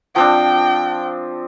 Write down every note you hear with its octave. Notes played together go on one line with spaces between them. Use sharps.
F3 C4 D4 G5